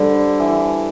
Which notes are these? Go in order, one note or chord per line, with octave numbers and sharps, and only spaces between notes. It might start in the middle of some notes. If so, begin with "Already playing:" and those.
Already playing: D3 G3 D4 G4 C5
E3